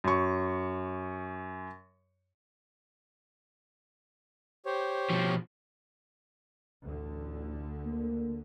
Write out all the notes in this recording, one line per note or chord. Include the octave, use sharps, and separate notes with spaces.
F#2 C#6
G4 C5 C#5
B2 F3
A1 D2 D3
A#3